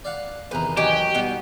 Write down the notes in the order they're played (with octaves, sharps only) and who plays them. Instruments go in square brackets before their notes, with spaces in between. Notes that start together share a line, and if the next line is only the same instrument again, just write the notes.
[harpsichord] D5 F5 F#5
[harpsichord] E2 C3 D#3 [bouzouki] B4 A#5
[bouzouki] F#3 D#5 G#5 [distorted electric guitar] G4
[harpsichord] B2 G3 [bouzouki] B3 D#4 F#4